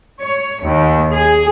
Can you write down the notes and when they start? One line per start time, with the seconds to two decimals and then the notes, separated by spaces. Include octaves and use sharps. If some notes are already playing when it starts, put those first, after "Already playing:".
0.21 C#5
0.63 D#2
1.12 G#4